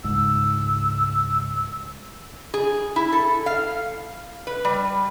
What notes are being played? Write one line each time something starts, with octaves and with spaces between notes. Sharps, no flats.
C#2 G#2 E6
G#4
E4
A4
F5
B4
G3